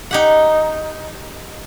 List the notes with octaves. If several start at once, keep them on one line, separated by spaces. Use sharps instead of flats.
D#4 G4 F#5